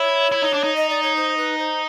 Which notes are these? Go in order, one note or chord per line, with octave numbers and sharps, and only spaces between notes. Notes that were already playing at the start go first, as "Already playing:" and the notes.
Already playing: E4 C#5
E4
D#4
D4
D#4
D#5
D5
C#5
C5
B4
C5